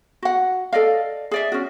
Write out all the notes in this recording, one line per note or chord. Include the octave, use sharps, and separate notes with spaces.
F#4 F#5
A4 D5 D#5 F5
G#4 D5 E5
C#4 F#4